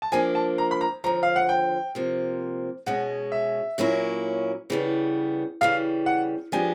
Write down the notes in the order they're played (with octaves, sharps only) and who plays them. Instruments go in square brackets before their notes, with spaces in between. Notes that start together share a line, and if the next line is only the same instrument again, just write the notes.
[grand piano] A5
[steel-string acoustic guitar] F3 A#3 D4 [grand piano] G#5
[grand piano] A5
A#5
B5
A#5
[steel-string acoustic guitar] D#2 D3 F3 [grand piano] A#5
[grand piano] F5
F#5
G5
[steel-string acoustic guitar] C3 F3 A#3
[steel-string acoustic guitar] B2 G#3 C#4 [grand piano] F#5
[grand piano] E5
[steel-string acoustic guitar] A#2 F#3 A#3 C#4 E4
C#3 E3 G3 B3
[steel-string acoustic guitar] C#3 E3 G3 [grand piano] F5
[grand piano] F#5
[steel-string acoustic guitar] F3 G#3 B3 D4 G4 [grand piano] G#5